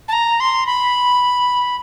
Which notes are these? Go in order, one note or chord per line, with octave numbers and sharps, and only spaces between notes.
A5
A#5
C6
B5